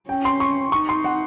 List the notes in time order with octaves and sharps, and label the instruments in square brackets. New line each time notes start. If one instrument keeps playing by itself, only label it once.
[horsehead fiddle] C#4 [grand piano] G5
[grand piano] C6
C#6
[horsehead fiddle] D#4 [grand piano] C#6
[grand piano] C6
F#5